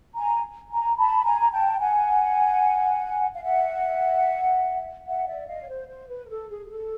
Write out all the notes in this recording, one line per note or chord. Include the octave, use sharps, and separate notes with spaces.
G#5 A#5
G#5 A#5
A5 B5
G#5 A#5
A#5
G5 A5
F#5 G#5
F5
E5 F#5
E5 F#5
D5 E5
D#5 F5
C#5
C5
C5
B4
A#4
A4
G#4
G#4
A4